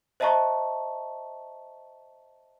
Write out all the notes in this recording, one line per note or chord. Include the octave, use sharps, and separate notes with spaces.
C5 D#5 E5 A5 A#5 C#6